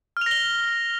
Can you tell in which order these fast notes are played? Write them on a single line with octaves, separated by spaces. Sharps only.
F6 F7 A#6 G7